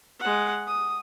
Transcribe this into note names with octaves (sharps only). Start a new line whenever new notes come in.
G#3 F#5
D#6